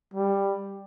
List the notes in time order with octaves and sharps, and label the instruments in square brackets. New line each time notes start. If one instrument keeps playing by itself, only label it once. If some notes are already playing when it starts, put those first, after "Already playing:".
[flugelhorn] G3